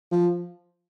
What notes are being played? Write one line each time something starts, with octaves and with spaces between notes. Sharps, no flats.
F3